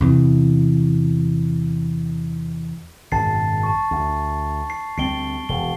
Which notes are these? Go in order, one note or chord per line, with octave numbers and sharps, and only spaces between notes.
E2 C3 E3
G#1 F#2 B2 A5 A6 C7
A5 C#6
D2
C7
D2 G3 C4 C7 D7 G7
E1 G7